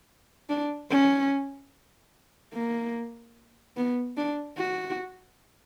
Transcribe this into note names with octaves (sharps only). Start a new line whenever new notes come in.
D4
C#4
A#3
B3
D4
F#4